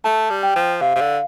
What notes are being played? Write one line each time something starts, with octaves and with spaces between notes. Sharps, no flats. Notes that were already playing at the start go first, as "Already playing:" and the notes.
A3 A5
G3
G5
F3
C3 F5
C3
D3